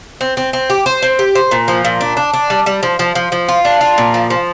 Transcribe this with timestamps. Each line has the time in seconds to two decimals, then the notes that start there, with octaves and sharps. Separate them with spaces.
0.21 C4
0.37 C4
0.53 C4
0.70 G4
0.86 C5
1.02 C4
1.19 G4
1.35 C5
1.51 A#2
1.68 F3
1.85 A#2
2.01 D4
2.17 D4
2.33 D4
2.50 G3
2.66 G3
2.83 F3
2.99 F3
3.15 F3
3.32 F3
3.48 F4
3.65 D4
3.81 F4
3.98 A#2
4.14 F3
4.30 F3